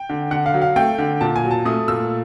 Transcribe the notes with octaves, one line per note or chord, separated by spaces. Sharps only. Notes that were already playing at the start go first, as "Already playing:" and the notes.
Already playing: G5
D3
D3 F#5
F5
F#3
F5
A3 G5
D3
A#2 A5
G#5
F#3
A5
A3 D#6
A#2 E6